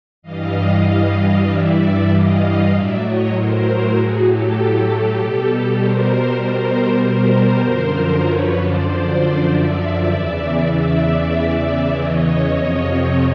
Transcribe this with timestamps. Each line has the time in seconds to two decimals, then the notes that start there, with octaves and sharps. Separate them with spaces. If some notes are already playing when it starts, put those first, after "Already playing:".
0.22 G2 E3 G3 D#5 F5
1.46 D5 E5
2.08 D#5 F5
2.69 A2 F#3 D5 E5
3.00 C#5 D#5
3.31 A#4 C5
3.92 F#4 G#4
4.23 G4 A4
5.17 B2 G3
5.77 A#4 C5
6.40 A#4 C5
7.01 A#4 C5
7.63 F#2 D3 F3
8.24 B4 C#5
8.56 C5 D5
8.87 C5 D5
9.49 D5 E5
10.10 E2 C#3 E3
10.72 D5 E5
11.95 C#5 D#5
12.57 F2 C3 F3